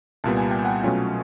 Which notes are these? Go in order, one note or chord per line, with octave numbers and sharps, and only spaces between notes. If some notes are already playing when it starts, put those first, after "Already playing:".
C2 A#2 G3 B3 A5
G#5
G5
F#5 G#5
B2 F#3 A3 C#4 F4